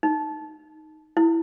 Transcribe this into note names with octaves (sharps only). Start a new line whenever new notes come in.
D#4
E4